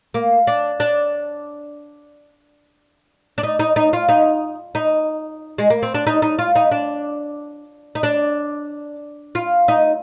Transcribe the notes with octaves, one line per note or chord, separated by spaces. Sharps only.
A#3
D4
D4
D4
D#4
D#4
D#4
F4
D#4
D#4
G#3
A#3
C4
D4
D#4
D#4
F4
D#4
D4
D#4
D4
F4
D#4